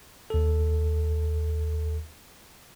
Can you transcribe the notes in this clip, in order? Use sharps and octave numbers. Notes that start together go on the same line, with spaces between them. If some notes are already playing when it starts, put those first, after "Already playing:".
D#2 A4